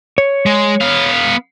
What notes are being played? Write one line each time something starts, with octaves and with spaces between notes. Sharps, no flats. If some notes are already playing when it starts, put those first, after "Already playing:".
C#5
G#3
B3 F5